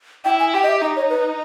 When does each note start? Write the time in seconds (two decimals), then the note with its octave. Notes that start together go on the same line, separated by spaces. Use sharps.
0.25 E4 G5
0.40 G#5
0.54 G4 G5
0.63 D#5
0.68 E5
0.82 D#4 D#5
0.96 C#5
1.10 B4